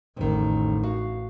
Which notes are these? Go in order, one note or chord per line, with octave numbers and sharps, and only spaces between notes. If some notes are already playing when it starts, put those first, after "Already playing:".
A1 F2 D#3
F#4 F5